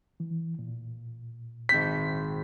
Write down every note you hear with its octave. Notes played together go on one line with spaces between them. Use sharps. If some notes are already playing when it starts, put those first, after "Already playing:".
E3
A#2
G#1 C4 G6 B6